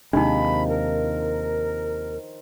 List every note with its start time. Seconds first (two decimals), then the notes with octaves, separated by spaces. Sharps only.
0.13 D#2 C3 D#3 F3 G#3 D4 D#4 B5
0.68 A#4